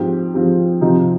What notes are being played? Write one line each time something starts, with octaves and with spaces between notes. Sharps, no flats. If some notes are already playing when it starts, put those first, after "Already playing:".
Already playing: G#2 F3 C4 G4
G#2 F3 C4 G4
C3 F3 C4 D#4